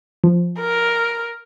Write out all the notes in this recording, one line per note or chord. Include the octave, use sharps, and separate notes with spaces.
F3
A#4